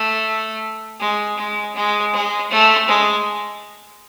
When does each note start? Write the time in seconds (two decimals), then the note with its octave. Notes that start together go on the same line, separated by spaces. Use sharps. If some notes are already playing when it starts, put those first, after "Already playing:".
Already playing: A3
1.00 G#3
1.37 G#3
1.75 G#3
2.13 G#3
2.50 A3
2.87 G#3